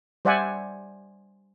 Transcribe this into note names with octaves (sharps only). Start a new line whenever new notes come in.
G3 C5 D5 E5 F#5 G#5